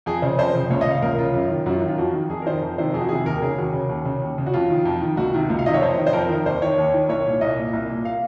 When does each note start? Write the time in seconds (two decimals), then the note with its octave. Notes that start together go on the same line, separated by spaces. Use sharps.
0.06 F2 G#4
0.22 C#3 C5
0.38 F2 C5
0.55 C#3
0.70 C#2 C#5
0.81 D#5
0.86 C#3 F5
1.02 C#2 A#4
1.18 C#3 F4
1.34 F#2
1.50 D#3
1.66 F#2 F#4
1.73 F4
1.82 D#3
1.88 F4
1.98 F2 F#4
2.14 D#3
2.30 F2 G#4
2.42 A#4
2.46 D#3 C5
2.62 F2
2.78 C3 D#3 C5
2.94 F2 G#4
3.01 F#4
3.09 C3 D#3 G#4
3.26 D#2 A#4
3.42 C#3 G#4
3.58 D#2 F#4
3.73 C#3
3.89 D#2
4.05 C#3
4.22 D#2
4.38 C#3
4.46 F#4
4.54 F2 F4
4.70 D#3
4.85 F2
5.01 D#3
5.17 C#2 F#4
5.34 C3 D#3
5.50 C#2
5.59 F5
5.66 C3 D#3 D#5
5.74 C#5
5.81 F2 C5
5.98 D#3
6.07 C5
6.13 F2 A#4
6.29 D#3
6.46 D#2 C5
6.62 D#3 C#5
6.78 D#2
6.94 D#3
7.09 C2 C#5
7.25 A#2
7.41 C2 D#5
7.57 A#2
7.73 C2
7.90 A#2
8.05 F5